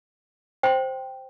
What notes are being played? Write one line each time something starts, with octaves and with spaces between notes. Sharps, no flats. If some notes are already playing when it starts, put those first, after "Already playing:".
C5 G5 C6